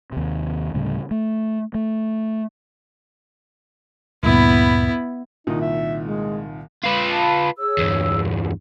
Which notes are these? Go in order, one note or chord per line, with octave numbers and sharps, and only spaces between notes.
D#2 C3
D2 A2 C#3 G3
A3
A3
D2 G2 A#2 B3 E4
C2 A#2 D#3 D#4
E5
G#3
F4 B4
A5 B5
G#4 C#5 E6
E2 G2